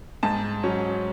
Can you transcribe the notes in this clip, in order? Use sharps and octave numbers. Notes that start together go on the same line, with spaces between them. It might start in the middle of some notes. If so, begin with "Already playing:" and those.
G#2 A5
F#3 C#4